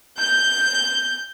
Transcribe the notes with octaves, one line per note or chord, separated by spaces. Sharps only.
G6